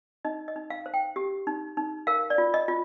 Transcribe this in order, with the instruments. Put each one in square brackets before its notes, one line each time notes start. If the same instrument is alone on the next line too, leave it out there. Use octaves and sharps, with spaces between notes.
[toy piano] D#4 D#5
D#5
D#4
F5
C5
G5
G4
D#4
D#4
A#4 F5
D5
F4
D#5
F4